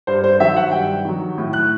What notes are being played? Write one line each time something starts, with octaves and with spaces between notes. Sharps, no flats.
G2 C5
C5
D#3 F#3 E5
F#5
G2 G5
D#3 F#3
A2
F#6